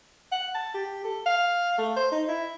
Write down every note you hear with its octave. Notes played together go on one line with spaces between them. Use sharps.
F#5
A5
G4
A4
F5
A3
C5
D#4
E4